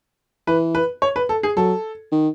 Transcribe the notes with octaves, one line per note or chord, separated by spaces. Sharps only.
E3 B4
B4
C#5
B4
A4
G#4
F#3 A4
D#3